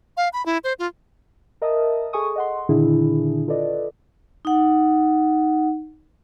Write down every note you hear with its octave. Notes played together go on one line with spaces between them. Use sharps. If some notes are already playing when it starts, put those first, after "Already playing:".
F5
B5
E4
C5
F4
A#4 D#5 E5 A5 D#6
G#4 A4 G#5 C#6 D#6
D#5 F#5 C6
A#2 D3 D#3 D4 E4 G#4
F4 A4 B4 D5 D#5
D#4 F#5